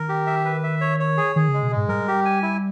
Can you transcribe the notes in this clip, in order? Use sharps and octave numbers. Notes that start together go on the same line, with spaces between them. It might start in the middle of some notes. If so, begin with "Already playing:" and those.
Already playing: D#3 A#4
G4
E5
B4
E5
C#5
C#5
G#4
D#3 G#4
C#3
G#3
B2
G#2 G#3
G3 A#4
G4
G#5
E4